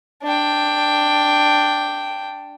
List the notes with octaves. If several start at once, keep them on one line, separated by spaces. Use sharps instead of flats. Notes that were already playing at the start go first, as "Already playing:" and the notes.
D4 G5